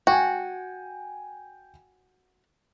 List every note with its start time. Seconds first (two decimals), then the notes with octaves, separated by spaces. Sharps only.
0.07 F#4 G5 G#5